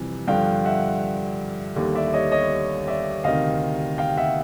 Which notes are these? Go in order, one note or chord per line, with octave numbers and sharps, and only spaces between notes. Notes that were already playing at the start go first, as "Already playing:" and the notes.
Already playing: F2 C3 E3 G3
G2 D3 F3 F5 G5
E5 F#5
D#2 D3 G3
D5 E5
E5
C#5 D#5
C#5 D#5
D5 E5
D2 C3 D#3 D#5 F5
F5 G5
E5 F#5